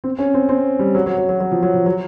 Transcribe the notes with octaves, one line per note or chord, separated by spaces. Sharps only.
C4
C#4
C4
C4
G3
F#3
F#3
F#3
F#3
F#3
F3
F#3
F3
F#3